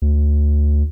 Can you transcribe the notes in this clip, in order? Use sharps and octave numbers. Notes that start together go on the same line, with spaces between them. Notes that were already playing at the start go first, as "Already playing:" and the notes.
D2